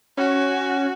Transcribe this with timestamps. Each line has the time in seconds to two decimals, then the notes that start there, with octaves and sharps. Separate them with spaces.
0.17 C#4 F#4